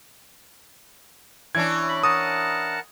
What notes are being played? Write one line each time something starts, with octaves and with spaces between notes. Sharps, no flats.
E3 C#4 D4 G#6
B5
A#4 F#5 A5 D#6